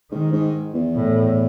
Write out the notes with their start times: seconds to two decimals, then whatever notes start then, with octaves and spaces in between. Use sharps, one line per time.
0.11 G#2 D#3
0.33 G#2
0.74 E2
0.96 A2